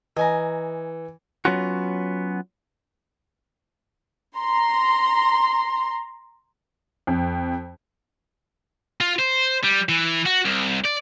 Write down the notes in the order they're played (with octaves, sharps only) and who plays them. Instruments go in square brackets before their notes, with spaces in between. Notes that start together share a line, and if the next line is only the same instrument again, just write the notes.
[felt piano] E3 [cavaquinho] D#5 G#5 A#5
[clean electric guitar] F#3 B3 C#4 F4 F#4
[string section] A#5 C6
[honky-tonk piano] F2
[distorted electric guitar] F4
C5
G3
E3
F#4
C2
D5